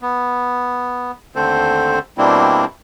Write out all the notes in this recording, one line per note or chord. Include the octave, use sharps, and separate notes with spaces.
B3
D#2 D3 A3 C4 A4 C5
B2 G3 A#3 C4 D4 E4